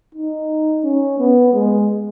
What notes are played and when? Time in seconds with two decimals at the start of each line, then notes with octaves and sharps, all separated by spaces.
0.15 D#4
0.84 C#4
1.19 B3
1.54 G#3